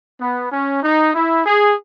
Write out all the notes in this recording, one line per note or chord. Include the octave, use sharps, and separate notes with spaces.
B3
C#4
D#4
E4
G#4